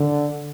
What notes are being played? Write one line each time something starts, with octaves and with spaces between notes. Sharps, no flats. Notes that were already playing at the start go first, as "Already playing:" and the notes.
Already playing: D3